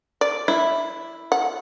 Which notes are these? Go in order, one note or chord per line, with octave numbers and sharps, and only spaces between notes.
D5
E4
F#5